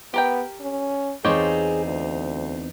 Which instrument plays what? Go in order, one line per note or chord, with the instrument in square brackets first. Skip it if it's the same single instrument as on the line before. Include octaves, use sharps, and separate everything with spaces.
[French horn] B3 [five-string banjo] G4 A#4 G5
[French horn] C#4
[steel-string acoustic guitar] E2 C4 D#4 [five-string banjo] F4 G4 C#5 [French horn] G#4
[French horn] D2